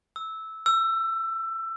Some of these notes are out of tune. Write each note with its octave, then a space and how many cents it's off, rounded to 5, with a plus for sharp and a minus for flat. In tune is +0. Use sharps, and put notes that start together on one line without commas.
E6 -10
E6 +20